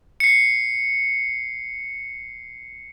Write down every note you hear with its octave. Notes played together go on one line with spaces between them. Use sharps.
C7 C#7